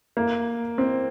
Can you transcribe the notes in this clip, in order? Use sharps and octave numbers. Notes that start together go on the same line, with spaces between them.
A#3
C4